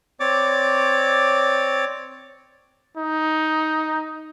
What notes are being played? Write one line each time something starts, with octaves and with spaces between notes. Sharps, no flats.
C4 C#5 D5 D6
D#4